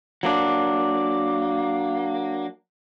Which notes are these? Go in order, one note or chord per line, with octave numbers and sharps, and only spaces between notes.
F#3 A#3 D4